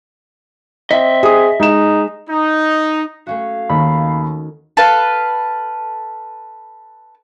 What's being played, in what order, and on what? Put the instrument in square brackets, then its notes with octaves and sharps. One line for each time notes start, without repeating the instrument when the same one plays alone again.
[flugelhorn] C4 [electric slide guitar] D#5 E5 [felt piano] B6
[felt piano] G#4 D#6
[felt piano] G#3 E7 [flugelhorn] D#4
[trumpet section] D#4
[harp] A3 C#4 F#4 [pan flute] F5
[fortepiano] D#2 [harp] D#3 [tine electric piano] B5
[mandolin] A4 B4 F5